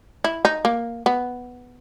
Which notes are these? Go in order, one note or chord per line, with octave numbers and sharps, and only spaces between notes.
E4
D#4
A#3
B3